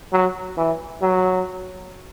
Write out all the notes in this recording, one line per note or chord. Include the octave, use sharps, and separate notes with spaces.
F#3
E3
F#3